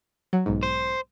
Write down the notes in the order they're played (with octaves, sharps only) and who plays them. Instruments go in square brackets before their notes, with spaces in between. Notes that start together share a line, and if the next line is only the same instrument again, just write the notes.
[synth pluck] F#3
B1 G#2
[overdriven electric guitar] C5